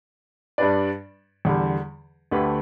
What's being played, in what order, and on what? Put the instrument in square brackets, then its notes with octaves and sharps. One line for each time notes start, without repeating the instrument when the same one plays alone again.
[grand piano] G2 G3 D4 B4 D5
E2 D3 G3
D2 D3 A3 G4 B4